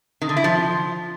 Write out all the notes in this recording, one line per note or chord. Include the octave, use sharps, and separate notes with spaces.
D#3
D3
E4
F3